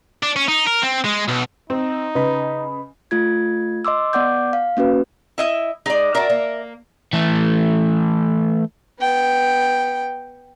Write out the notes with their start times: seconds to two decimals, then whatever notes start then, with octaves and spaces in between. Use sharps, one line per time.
0.23 D4
0.36 C#4
0.48 D#4
0.67 A#4
0.83 C4
1.05 G#3
1.29 B1
1.70 C4 D#4
2.15 C#3 B4 D#5 B5
3.11 A3 F4 G#6
3.85 D#5 C6 D6 E6
4.13 B3 D5 F#5 D6 G6
4.53 F5
4.77 A#3 C#4 F#4 B4
5.38 E4 D#5 E5
5.86 G#3 D#4 D5
6.14 D4 F#4 A#4 E5
6.30 A#3
7.13 E3 A3
9.00 B3 G5